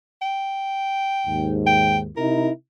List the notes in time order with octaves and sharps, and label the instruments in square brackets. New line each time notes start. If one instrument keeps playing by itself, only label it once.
[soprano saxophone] G5
[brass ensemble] D#2 G#2
[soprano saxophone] G5
[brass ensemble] C3 D#4 E4 [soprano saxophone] A#4